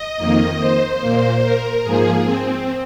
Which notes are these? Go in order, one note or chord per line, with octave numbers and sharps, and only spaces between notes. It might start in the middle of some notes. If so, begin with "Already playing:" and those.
Already playing: D#5
F2 D#3 A#3
C5
A#2 A#3
A#4
G#2 F3 A#3 G#4
C4